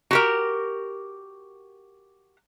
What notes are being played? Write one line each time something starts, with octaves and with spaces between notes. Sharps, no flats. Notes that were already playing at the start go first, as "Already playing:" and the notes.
F#4 G4 A#4